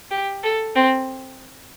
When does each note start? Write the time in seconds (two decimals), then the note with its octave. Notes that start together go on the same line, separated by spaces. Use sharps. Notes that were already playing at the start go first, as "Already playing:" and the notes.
0.11 G4
0.43 A4
0.76 C4